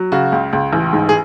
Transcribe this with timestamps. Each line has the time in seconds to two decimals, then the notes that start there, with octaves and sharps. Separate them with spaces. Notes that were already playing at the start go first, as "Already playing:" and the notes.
Already playing: F#3
0.12 C#3 F#4
0.32 C#2
0.53 C#2
0.73 A1
0.93 G#2
1.09 G#4